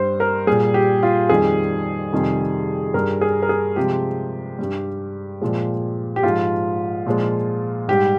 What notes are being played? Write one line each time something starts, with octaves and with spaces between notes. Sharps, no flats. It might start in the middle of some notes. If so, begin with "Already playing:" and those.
Already playing: G2 G3 C5
A#4
A#2 G3 G#4
G4
F4
F2 D#3 G3 G#4
F2 C3 D#3 G3
G2 G3 A#4
G#4
A#4
G#4
C3 F3 G#3 G4
G2 G3
A#2 F3 G#3
G4
G#2 F3 G#3 F4
A#2 F3 G#3
G#2 G3 G4